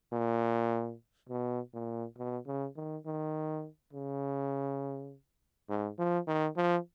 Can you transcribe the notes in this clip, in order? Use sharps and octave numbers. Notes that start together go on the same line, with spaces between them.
A#2
B2
A#2
B2
C#3
D#3
D#3
C#3
G#2
F3
D#3
F3